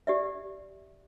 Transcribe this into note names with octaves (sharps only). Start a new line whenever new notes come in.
G4 D5 E5